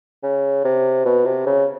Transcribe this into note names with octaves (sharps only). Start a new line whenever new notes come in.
C#3
C3
B2
C3
C#3